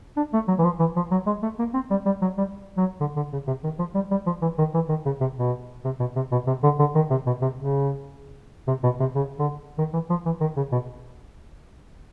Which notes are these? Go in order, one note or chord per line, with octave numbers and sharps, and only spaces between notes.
D4
A3
F#3
E3
F3
E3
F3
F#3
G#3
A3
A#3
C4
G3
G3
F#3
G3
F#3
D3
D3
C#3
C3
D#3
F3
G3
G3
F3
E3
D#3
E3
D#3
C#3
C3
B2
C3
B2
C3
B2
C3
D3
D3
D#3
C3
B2
C3
C#3
C3
B2
C3
C#3
D3
D#3
E3
F3
E3
D#3
C#3
B2